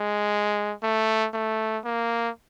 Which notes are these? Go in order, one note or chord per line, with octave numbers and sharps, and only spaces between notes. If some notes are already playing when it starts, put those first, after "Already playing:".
Already playing: G#3
A3
A3
A#3